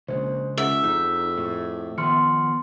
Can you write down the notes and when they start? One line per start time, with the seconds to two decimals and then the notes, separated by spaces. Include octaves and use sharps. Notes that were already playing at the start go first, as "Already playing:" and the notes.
0.08 A#1 C#3 G#3 C5
0.58 C#2 G#4 E5 F#5
0.84 F2 D#4
1.37 A2
1.98 D#3 F3 B3 C6 F6 C#7